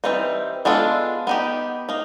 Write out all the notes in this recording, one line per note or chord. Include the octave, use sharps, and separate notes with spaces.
E3 G3 C4 D#4
G#3 B3 D4 F4 A4
B3 D#4 G4
A#3 D#4